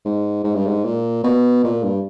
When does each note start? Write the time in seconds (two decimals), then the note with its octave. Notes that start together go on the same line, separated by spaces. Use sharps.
0.05 G#2
0.44 G#2
0.55 G2
0.67 G#2
0.84 A#2
1.24 B2
1.64 A#2
1.83 G2